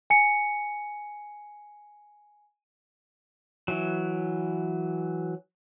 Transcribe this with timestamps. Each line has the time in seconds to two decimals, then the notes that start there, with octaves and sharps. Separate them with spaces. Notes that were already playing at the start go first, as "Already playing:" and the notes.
0.10 G#5 C#7
3.68 E3 F#3